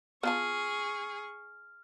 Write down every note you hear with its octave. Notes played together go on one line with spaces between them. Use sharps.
B3 F4 G#4 A5 C#6 F6